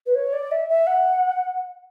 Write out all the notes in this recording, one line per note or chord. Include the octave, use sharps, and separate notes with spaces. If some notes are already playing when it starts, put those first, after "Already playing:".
B4
C#5
D5
E5
E5
F#5